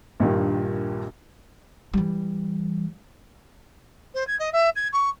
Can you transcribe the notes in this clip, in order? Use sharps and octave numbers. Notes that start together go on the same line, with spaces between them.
A#1 G2 A#2 D#3 G3
E3 G3
C5
G#6
D#5
E5
G#6
C#6